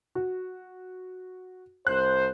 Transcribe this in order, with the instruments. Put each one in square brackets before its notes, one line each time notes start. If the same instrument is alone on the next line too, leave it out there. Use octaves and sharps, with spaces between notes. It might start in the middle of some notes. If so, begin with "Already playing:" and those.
[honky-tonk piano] F#4
[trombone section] C2 C5 [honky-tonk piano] F#6